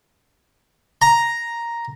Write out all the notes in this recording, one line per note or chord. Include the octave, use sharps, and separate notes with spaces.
A#5